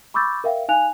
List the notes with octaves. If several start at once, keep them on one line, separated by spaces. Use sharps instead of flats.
B5 C#6 D6 E6 G6 A6
A#4 E5 F5 G5
D#4 F5 G#5 F#6 F7